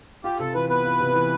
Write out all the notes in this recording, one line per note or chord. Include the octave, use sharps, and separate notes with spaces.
F4 G4
C3 A4
E3 B4
B3 B4
F4
C3
E3